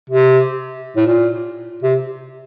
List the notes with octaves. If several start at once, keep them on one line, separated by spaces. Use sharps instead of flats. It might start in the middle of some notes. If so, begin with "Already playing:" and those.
C3
A2
A#2
C3